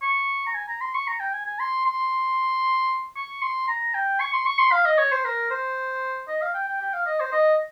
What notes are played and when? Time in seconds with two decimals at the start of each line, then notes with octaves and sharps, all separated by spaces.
0.02 C#6
0.47 A#5
0.54 G#5
0.68 A#5
0.81 C6
0.95 C#6
1.08 A#5
1.20 G5
1.34 G#5
1.46 G#5
1.60 C6
1.86 C6
3.16 C#6
3.42 C6
3.68 A#5
3.95 G5
4.20 C#6
4.33 C6
4.46 C#6
4.59 C6
4.72 F5
4.85 D#5
4.98 C#5
5.12 C5
5.25 A#4
5.51 C5
6.28 D#5
6.42 F5
6.54 G5
6.68 G5
6.81 G5
6.94 F5
7.06 D#5
7.20 C5
7.33 D#5